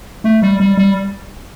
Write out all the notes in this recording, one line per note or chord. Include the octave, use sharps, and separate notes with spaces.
A3
G3
G3
G3